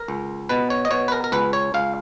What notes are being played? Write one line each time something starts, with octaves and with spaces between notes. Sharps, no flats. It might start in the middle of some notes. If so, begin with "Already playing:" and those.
Already playing: A#4
C#2
B2 B4
C#5
D#5
B2 C#5
B4
A#4
A#4
C#2 B4
C#5
C#2 F5